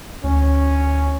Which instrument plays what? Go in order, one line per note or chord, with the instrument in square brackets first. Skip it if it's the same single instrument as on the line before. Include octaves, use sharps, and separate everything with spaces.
[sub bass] D2 [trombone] C#4